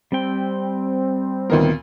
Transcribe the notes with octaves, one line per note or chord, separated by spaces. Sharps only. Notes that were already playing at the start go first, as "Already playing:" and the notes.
G3 C4 G5
D2 A#2 D#3 B3 A#4